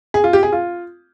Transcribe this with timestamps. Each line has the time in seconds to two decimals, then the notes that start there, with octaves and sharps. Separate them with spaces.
0.14 G#4
0.24 F4
0.33 G4
0.43 G#4
0.52 F4